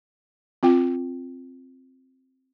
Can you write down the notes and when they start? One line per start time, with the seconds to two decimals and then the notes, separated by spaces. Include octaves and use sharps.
0.63 C4 F4 G5